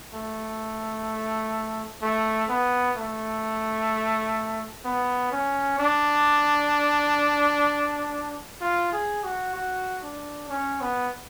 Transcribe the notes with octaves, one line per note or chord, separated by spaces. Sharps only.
A3
A3
B3
A3
B3
C#4
D4
F4
G#4
F#4
F#4
D4
C#4
B3